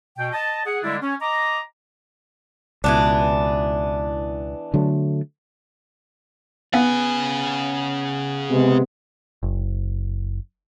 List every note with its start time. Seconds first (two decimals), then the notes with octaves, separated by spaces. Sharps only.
0.18 B2 G5
0.32 D#5 A5
0.66 G#4 F#5
0.83 D3 G3 G#3 A#3 D4 E4
1.02 C#4
1.21 D#5 A#5 D6
2.84 C#2 B2 E3 B3 D4
4.74 D3 F#3 A3
6.74 C#3 B3 G#5
8.51 C3 G#3 B3
9.43 F#1